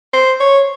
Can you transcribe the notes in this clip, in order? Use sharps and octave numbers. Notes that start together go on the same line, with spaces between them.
C5
C#5